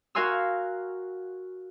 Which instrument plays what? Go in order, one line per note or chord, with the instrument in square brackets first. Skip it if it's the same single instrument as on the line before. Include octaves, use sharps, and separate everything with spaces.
[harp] F#4 A#4 F5 G#5 C6 E6